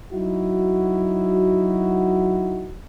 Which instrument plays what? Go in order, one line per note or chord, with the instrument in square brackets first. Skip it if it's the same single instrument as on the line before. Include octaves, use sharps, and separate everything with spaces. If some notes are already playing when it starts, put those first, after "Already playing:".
[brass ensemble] F#3 D#4 E4 F#4